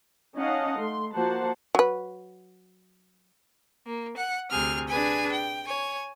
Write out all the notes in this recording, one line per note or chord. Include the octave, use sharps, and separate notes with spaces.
C#4 D#4 D#5 F5 F#5 A5
A3 C6
F3 A#3 F#4 C5 F#5 A5
F#3 B4
A#3
F#5
D2 C3 G#4 F6
D4 G#4 B4 G#5
G5
C#5 G#5